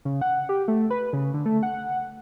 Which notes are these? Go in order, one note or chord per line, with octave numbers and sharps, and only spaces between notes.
C#3
F#5
G4
A3
B4
C#3
D3
A3
F#5